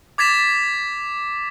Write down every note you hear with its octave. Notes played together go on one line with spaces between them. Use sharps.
D6 G#6 A6 B6 E7